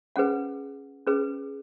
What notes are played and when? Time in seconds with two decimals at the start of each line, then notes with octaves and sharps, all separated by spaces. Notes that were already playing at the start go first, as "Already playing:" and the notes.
0.16 C#4 G#4 B4 F#5
1.07 C#4 G#4 B4